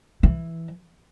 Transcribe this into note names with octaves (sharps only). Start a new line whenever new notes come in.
E3